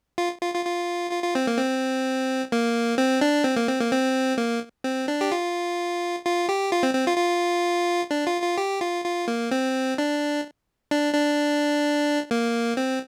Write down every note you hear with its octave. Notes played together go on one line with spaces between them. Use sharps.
F4
F4
F4
F4
F4
F4
C4
A#3
C4
A#3
C4
D4
C4
A#3
C4
A#3
C4
A#3
C4
D4
G4
F4
F4
G4
F4
C4
C4
F4
F4
D4
F4
F4
G4
F4
F4
A#3
C4
D4
D4
D4
A#3
C4